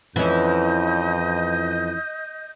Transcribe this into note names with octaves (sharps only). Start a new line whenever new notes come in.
F2 E3 C#4 D#5 G6